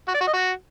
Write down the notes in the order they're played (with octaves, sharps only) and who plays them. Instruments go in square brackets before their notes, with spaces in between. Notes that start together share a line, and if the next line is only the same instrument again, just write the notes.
[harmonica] F#4
D5
F#4
D#5
F#4